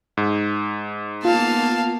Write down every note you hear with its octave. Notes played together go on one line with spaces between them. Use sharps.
G#2
A#3 B3 F4 F5 A5